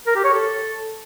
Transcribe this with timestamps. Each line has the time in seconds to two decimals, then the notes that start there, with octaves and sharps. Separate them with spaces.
0.07 A#4
0.16 G4
0.24 C#5
0.33 A4